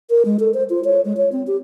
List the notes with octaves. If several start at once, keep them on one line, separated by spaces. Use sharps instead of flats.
A#4
G#3
A4
C5
F4
C#5
G#3
C#5
C4
G4